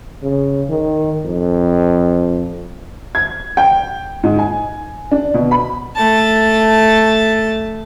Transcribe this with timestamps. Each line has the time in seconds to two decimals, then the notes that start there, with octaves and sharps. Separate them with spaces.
0.23 C#3
0.69 D#3
1.25 F2
3.15 G#6
3.57 G5
4.24 G#2
4.39 G#5
5.11 D4
5.34 B2
5.51 B5
5.96 A3 A5